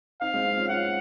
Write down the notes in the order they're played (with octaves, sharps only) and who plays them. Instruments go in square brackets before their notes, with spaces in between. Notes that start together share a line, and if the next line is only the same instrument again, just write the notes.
[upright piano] C4 D#4 [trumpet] F5
[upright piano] G#3 C4
C4 D#4
C#4 F4
[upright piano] C#4 F4 [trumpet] F#5